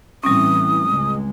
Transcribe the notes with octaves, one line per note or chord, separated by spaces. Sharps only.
A2 E3 G3 C4 C#4 D#6
C#2 G#3